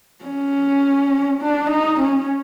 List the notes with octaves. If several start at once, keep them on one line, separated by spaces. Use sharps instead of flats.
C#4
D4
D#4
C#4